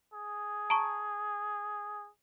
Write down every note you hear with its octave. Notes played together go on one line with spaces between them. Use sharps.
G#4
A5 A#5 C#6